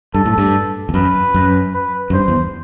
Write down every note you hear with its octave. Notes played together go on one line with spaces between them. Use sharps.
G2 A4
A2
G2
E2
F#2 B4
F#2
B4
F#2
G2 C5
E2